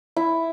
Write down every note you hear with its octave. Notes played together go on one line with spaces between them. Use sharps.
E4